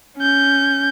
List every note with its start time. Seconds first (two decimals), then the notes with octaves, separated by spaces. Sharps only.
0.17 C#4 G6